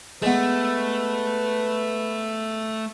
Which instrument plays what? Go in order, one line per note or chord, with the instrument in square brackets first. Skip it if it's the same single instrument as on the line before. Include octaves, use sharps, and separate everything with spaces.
[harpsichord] G#3 B3 [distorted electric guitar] A3 [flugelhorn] B4